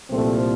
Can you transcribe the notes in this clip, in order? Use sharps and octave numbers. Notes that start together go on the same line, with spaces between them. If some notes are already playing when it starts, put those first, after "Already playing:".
C2 A#2 F3 A3 C4